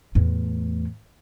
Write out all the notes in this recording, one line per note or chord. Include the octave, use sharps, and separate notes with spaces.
E2 A2